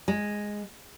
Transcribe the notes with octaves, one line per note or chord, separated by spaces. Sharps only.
G#3